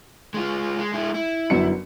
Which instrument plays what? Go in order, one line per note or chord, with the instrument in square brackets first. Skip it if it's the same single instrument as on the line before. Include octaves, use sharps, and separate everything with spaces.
[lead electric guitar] G#3 F4
G#3
G#3 E4
E4
[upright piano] G1 F#2 C#7